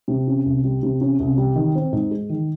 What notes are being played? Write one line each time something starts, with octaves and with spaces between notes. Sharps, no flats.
C3
C#4
C2
G3
C3
C#4
C2
G3
D#3
C4
G#2
G#3
D#3